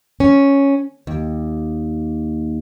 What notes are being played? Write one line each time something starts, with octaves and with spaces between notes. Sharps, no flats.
C#4
D#2